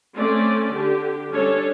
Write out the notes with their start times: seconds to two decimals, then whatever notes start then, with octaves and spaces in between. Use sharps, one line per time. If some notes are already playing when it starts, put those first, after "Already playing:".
0.15 A3 C4 C#4 D5
0.72 D3 G4
1.32 G3 C#4 D4 A4 C#5